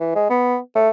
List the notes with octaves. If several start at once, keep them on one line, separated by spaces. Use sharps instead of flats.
E3
G#3
B3
A3